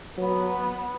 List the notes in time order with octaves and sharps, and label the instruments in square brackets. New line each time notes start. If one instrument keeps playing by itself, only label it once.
[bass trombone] F#3 [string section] B3